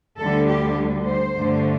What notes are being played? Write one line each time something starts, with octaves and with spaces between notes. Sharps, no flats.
D2 D3 G3 A4
G4
C5
G2 D3 A3